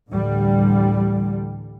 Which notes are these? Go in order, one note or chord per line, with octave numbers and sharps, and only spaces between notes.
D2 A2 D3 E3 G3